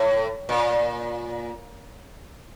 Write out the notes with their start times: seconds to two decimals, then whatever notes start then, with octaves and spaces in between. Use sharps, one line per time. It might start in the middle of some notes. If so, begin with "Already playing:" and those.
Already playing: A2
0.49 A#2